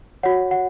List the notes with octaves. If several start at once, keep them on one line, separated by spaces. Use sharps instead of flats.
F#4 C#5 F#5
F#5